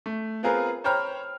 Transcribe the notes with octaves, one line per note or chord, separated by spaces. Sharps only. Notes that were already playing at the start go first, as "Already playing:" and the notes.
A3
B3 C4 F4 G#4 A#4 B4
C5 C#5 G5 A#5 B5 F6